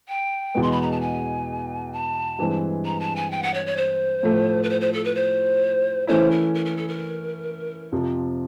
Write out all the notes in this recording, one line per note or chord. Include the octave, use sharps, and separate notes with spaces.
G5
E2 B2 G#3 B3
C6
B5
A#5
A5
G#5
A5
G2 E3 G#3 C4
A#5
A5
G#5
G5
F#5
C#5
C#5
C5
A2 F3 A3
B4
C5
C5
A4
B4
C5
E3 A3 C#4 E4 C5
A#4
A#4
A#4
A4
A#4
F2 C3 F3